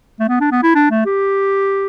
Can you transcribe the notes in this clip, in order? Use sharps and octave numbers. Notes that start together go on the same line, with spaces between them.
A3
B3
D4
B3
E4
D4
A3
G4